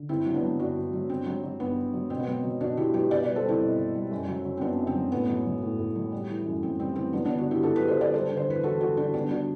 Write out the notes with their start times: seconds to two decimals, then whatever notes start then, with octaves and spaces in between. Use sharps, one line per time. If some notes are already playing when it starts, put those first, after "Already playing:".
Already playing: D3
0.09 G2 C4 E4
0.26 F#3
0.34 B3 D4
0.43 F#3
0.59 G2 D4 F#4
0.76 G2
0.93 F#3
1.10 G2 C4
1.26 F#3
1.43 F#3
1.60 G2 B3
1.77 G2
1.93 F#3
2.10 B2 C4
2.19 B3
2.27 F#3 C4
2.43 F#3
2.61 B2 D4 F#4
2.77 B2 E4 G4
2.94 F#3 G4 B4
3.11 B2 B4 D5
3.23 G3 B4 D5
3.36 A4 C5
3.44 G3 C4 E4
3.61 B2
3.78 B2
3.95 G3
4.11 F#2
4.28 F#3
4.45 F#3
4.57 C4
4.61 F#2 B3 D4
4.79 F#2
4.87 C4
4.95 F#3
5.12 A2 B3
5.29 F#3
5.46 F#3
5.62 A2
5.79 A2
5.96 F#3
6.12 G3
6.29 E3
6.46 F#2
6.62 F#2 C4
6.79 G3 C4
6.96 E3 C4
7.13 F#3 B3 D4
7.25 D3 B3 D4
7.38 D4 F#4
7.47 G2 E4 G4
7.63 G2 F#4 A4
7.76 F#3 G4 B4
7.88 A4 C5
7.97 D3 B4 D5
8.13 G3 A4 C5
8.30 D3
8.37 C5
8.47 E2 B4
8.63 E2 F#4 A4
8.80 G3 F#4 A4
8.97 D3 D4 F#4
9.14 G3 B3 D4
9.30 D3 D4 F#4